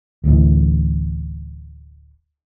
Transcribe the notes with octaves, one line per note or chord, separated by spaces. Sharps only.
D1 A1 D2 E3